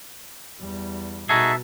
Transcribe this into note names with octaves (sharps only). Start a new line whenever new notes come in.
E2 G3
B2 D#4 F#4 G#4 A4 E5 A5